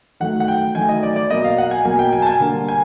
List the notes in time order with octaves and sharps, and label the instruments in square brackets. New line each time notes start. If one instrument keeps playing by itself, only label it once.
[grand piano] D#3 F#3 A3 F#5
F#5
G5
D#3 F#3 A3 G#5
D#5
D5
D5
B2 F#3 A#3 D#5
F5
F#5
G#5
B2 F#3 A#3 G#5
G5
G#5
A5
G#5
D3 G3 A#3
G#5